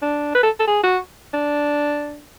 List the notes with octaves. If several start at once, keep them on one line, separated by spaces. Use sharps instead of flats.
D4
B4
A4
A4
G#4
F#4
D4